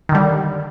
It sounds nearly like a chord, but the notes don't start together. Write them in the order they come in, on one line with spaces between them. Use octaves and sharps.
D#3 D3 G3